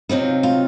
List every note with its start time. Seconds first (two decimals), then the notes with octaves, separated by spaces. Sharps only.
0.09 C3 F#3 C4 D#4 F4
0.43 F4